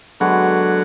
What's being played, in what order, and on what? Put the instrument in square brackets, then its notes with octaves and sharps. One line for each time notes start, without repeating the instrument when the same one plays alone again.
[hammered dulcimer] D3 G#3 B3 F#4 [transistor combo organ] F#3